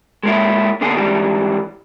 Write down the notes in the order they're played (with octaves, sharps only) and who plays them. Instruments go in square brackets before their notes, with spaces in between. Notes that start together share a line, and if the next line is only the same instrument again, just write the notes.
[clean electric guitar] G#3 A#3 E4
B2 D3 A#3 G#4
G#2 E3 G3